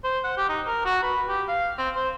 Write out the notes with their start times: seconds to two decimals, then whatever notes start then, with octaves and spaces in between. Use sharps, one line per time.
0.04 C5
0.24 F#5
0.37 G4
0.49 D#4
0.67 A#4
0.85 F#4
1.03 B4
1.29 G4
1.48 F5
1.78 C4
1.96 C5